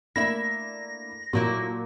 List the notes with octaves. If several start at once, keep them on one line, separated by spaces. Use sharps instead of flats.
A3 A#3 D4 E4 E5 A#6
A#2 F#3 A3 A#3 E4